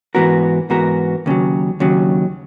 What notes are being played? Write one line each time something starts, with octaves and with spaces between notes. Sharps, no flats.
G#2 E3 B3 F#4 A#4
G#2 E3 B3 F#4 A#4
D#2 C#3 F#3
D#2 C#3 F#3